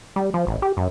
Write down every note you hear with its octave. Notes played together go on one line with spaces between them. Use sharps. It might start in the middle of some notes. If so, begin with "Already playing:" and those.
G3
F3
A1
G4
F#2